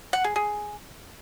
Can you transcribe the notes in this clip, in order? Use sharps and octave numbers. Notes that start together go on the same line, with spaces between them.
F#5
G#4
G#4